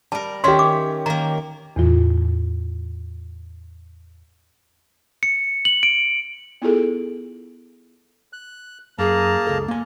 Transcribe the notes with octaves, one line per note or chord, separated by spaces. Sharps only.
G3 A#4 A5
D#3 C#4 G4 C#5 E5 C6
D6
D#3 A#3 A#5
E2 A2 E3 F4
C#7
F#7
D7
B3 E4 F4 G#4 A4
F#6
F#2 A#3 G#4 A5 A#5
C#2 A4
A#3 G#5